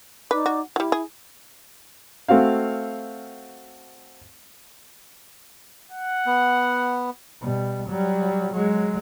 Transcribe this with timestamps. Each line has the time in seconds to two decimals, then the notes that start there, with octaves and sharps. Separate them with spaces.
0.31 D#4 B4 D5 D6
0.46 F#4
0.76 F#3 G3 E4
0.92 G#4
2.28 A3 C4 F#4 F5
5.91 F#5
6.26 B3
7.41 B2 G3
7.89 F#3 G3
8.53 F#3 G#3